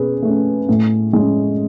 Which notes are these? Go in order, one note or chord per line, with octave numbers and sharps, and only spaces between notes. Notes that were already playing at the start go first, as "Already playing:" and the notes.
Already playing: B2 C#4 G#4 B4
A3 C#4
A2
G#3
C#4